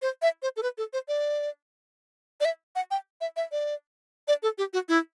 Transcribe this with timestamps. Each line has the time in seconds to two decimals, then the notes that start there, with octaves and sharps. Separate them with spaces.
0.02 C5
0.22 E5
0.42 C5
0.57 A4
0.63 B4
0.78 A4
0.93 C5
1.08 D5
2.41 D5
2.45 E5
2.76 F#5
2.91 G5
3.21 E5
3.37 E5
3.52 D5
4.28 D5
4.43 A4
4.58 G4
4.73 F#4
4.89 E4